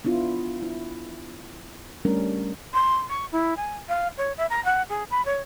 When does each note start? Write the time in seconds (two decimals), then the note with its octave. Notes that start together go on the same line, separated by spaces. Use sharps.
0.05 B3 D4 E4 F4
0.62 E4
2.05 G3 A3 C#4 D4 A#4
2.74 C6
3.09 C#6
3.32 E4
3.57 G#5
3.89 F5
4.17 C#5
4.38 E5
4.50 A#5
4.65 F#5
4.89 G#4
5.11 B5
5.25 C#5